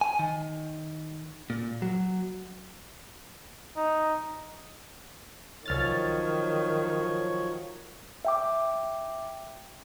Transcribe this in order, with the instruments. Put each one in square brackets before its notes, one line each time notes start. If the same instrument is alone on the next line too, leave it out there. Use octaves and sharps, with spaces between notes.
[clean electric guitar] G#5
D#3
A#2
F#3
[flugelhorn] D#4
[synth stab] C2 F6 A6 [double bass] D#3 [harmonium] F3 F#3 C#5
[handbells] E5 G5 D6